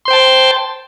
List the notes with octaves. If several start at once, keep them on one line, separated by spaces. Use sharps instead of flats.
C5 G5 A5 C6